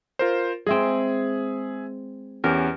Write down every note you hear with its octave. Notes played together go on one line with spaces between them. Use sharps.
F4 A#4 C5
G#3 C4 G#4 E5
E2 C#4 G4 A#4